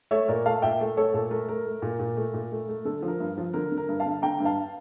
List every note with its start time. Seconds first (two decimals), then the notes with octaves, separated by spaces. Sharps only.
0.11 A3 C#5 E5
0.28 A#2 A#4 D5
0.45 A3 F5 A5
0.62 A#2 E5 G5
0.81 A3
0.97 A3 A4 C#5
1.14 A#2 A4
1.31 A3 A#4
1.49 A3 A#4
1.66 A3
1.82 A#2
1.99 A#2
2.17 A3
2.34 A#2
2.52 A3
2.69 A3
2.85 D3 A4
3.02 F3
3.08 A#4
3.20 G2
3.38 F3
3.53 D3 A#4
3.72 D3
3.78 A#4
3.89 G2
4.00 F5 A5
4.06 D3
4.22 D3 G5 A#5
4.40 G2
4.45 F5 A5